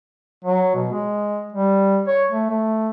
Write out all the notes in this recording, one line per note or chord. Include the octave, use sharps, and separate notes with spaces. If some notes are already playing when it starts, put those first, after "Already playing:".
F#3
B2
G#3
G3
C#5
A3
A3